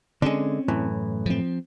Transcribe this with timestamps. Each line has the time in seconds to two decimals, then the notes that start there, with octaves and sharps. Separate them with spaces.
0.22 D3 G#3 C4 C#4
0.68 F#2 A2 E3
1.26 F3 C4